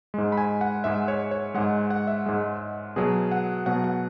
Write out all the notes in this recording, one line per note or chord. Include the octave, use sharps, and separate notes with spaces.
G#2 G#3
B5
G#5
F#5
G#2 G#3 E5
C#5
C#5
G#2 G#3 F#5
F#5
E5
G#2 G#3
B2 F#3 G#4
F#5
B2 F#3 F#5
F#5